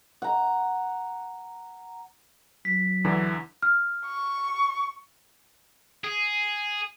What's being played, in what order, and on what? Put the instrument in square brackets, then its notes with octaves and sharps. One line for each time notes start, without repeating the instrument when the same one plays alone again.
[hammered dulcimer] F#5 A#5
[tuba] F#3 [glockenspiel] B6
[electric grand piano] E2 D3 E3
[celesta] F6
[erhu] C#6
[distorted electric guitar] G#4